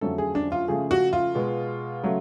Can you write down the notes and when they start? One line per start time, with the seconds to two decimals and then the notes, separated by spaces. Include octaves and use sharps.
0.01 F2 D3 F#3 A3 C#4 A4
0.18 G#4
0.35 D4
0.52 F4
0.68 C#3 F3 A3 G#4
0.91 F#4
1.13 F4
1.35 B2 G#3 B3
2.03 C#3 F#3 A3